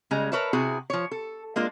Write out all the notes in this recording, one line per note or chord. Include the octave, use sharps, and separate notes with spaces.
C#3 G3 G#3 A#5
A#4 B4 C#5 E5 A5
C3 E4 F#4 G#4
F3 C#5
A4
G#3 A#3 D4 F4